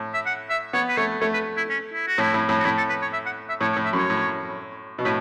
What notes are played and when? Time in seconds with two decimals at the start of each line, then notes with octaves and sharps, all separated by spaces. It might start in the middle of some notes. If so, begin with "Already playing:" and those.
Already playing: A2
0.14 E5
0.26 F#5
0.50 E5
0.73 B3 C#5
0.88 B4
0.97 A3 C#5
1.21 A3 C#5
1.34 B4
1.57 E4
1.70 C#4
1.93 E4
2.07 F#4
2.18 A2 E4
2.34 A2
2.49 A2
2.59 F#4
2.65 A2 E4
2.78 A4
2.89 B4
3.02 C#5
3.13 E5
3.26 F#5
3.49 E5
3.61 A2 C#5
3.73 C#5
3.77 A2
3.85 E5
3.93 F#2 C#5
4.10 A2
4.98 B2
5.05 A2 B4